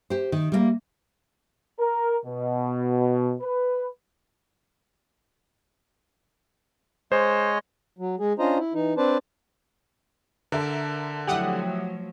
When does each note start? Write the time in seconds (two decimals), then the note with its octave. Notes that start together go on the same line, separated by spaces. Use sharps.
0.10 G4 C5
0.32 D#3
0.52 G3 G#3 A#3
1.79 A#4
2.26 B2
3.42 B4
7.12 G#3 C5 C#5 D#5
7.98 F#3
8.20 G#3 G#4
8.39 C#4 D4 F4 C5 D#5 A#5
8.58 E4
8.74 E3 D#4
8.98 C4 D4 B4 C5 D5 A5
10.52 D3 A#4 E5 A5
11.27 F3 F#3 A3 E4 G4 F#5 D#6 F#7